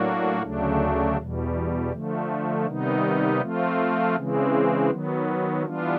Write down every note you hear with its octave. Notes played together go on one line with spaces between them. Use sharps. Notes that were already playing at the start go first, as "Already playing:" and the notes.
Already playing: A2 F#3 A#3 D4 F#4
D2 C#3 F#3 A3 D4
E2 B2 G3
D3 F3 A3
C3 D#3 G3 B3 D#4
F3 A3 C4 F4
C#3 E3 G#3 C4
D#3 F#3 B3
E3 G3 B3 D4 F4